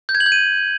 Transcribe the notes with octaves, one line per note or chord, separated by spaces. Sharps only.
G6
G#6
F#7
G6
D#7